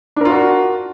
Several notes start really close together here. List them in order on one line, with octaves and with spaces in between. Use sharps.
D4 A#4 F4 F#4